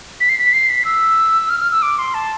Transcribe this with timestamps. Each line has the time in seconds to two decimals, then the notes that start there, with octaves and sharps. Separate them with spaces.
0.20 B6
0.29 C7
0.38 B6
0.53 C7
0.69 B6
0.85 E6
1.49 F6
1.60 F6
1.71 E6
1.82 D6
1.98 C6
2.14 A5